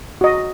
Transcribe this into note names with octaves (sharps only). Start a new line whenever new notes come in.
F#4 D#5